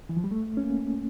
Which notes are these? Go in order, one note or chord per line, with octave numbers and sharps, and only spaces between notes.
E3
F3
G3
A3
C#4
A#3